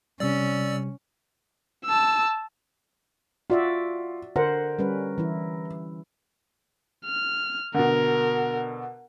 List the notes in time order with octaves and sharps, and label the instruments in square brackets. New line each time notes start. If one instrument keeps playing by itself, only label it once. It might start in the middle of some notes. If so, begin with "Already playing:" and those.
[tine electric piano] C3 G3 [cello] C#4 [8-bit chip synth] D5 E6
[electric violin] A5 E6
[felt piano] F4 [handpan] F#4 D5 E5
[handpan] D3 C5 F#5 [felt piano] A#4
[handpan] G3 C#4 B4
E3 E4
[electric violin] F6
[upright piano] B2 D3 [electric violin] A#4